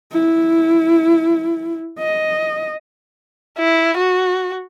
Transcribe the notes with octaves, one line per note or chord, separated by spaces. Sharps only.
E4
D#5
E4
F#4